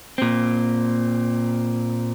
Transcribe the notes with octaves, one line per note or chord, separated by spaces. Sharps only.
A#2 C4